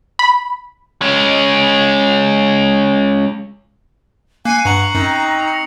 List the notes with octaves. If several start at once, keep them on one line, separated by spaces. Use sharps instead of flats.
B5
G#3 C#4
A#3 G#5 F#6 C7 C#7
G2 F#5 A#5 C#6 C#7 F#7
F#2 C4 D#4
A#6 C#7 F7